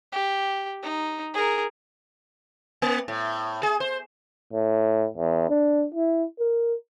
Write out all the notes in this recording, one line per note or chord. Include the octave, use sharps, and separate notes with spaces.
G4
D#4
G#4 A#4
A#3
A2
G#4
C5
A2
E2
D4
E4
A#4